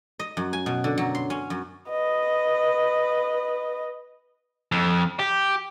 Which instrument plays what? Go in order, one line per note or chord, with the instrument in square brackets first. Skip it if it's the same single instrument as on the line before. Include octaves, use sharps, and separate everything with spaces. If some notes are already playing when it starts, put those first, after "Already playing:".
[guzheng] D#5
F#2
G#5
B2
D3
F#3
C6
C#4
F#2
[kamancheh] B4 D#5
[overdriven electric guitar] F2
G4